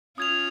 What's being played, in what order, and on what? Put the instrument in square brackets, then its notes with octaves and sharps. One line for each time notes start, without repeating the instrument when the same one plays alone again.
[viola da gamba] C#4 F4 [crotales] D#6 G#6 F7